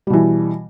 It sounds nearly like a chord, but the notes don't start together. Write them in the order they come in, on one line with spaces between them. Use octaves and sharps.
G3 B2 E3